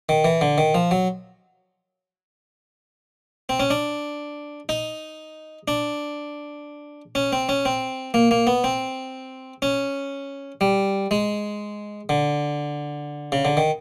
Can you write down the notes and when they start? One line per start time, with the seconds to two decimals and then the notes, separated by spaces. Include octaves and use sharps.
0.09 D#3
0.25 E3
0.41 D3
0.58 D#3
0.75 F3
0.91 F#3
3.49 C4
3.60 C#4
3.70 D4
4.69 D#4
5.68 D4
7.15 C#4
7.32 C4
7.49 C#4
7.65 C4
8.14 A#3
8.31 A#3
8.47 B3
8.64 C4
9.62 C#4
10.61 G3
11.11 G#3
12.09 D3
13.32 C#3
13.45 D3
13.57 D#3